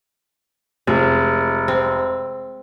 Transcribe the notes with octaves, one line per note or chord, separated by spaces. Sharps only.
F1 G#3
C4